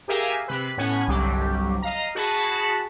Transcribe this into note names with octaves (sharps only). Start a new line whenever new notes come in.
G4 G#4 A#4 E5 F5 G#5
C3 B4
A2 B3 C#4 C#5 F#5 G#5
G1 C2 F#3 G3 G4
D#5 F5 A#5
F#4 G#4 A5 B5